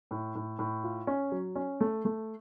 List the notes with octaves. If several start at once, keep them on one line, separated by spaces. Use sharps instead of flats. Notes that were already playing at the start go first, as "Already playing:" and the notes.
A2
A2
A2
F4
C#4
F#3
C#4
A3
A3